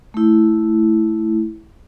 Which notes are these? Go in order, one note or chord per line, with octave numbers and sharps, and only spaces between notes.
A3 E4